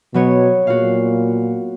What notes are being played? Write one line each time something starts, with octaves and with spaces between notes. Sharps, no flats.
B2 F#3 B3 C#5
A#2 F#4 F5